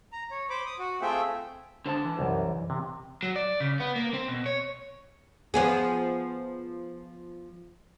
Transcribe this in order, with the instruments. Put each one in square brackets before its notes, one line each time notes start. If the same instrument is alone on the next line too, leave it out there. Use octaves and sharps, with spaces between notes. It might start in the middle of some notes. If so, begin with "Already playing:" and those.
[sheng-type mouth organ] A#5
C#5
C5 B5 D6
D#6
F#4
A3 C4 F4 G#4 E5 G5
[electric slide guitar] D3 C5 A5
E3
[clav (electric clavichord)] C2 F#2
C3
[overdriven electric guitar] F#3
D5
C#3
B3
A#3
C4
B2
C#5
[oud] F3 B3 G#4